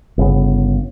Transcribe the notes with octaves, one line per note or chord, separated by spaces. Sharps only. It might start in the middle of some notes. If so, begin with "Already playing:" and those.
G1 C#3 B3